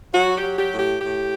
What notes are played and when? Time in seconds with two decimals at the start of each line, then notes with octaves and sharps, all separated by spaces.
0.14 F#3 F#4
0.36 G4
0.43 F#3
0.58 G4
0.72 A2
0.79 G4
1.01 A2 G4